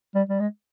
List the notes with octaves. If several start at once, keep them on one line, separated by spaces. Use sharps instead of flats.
G3
G3
G#3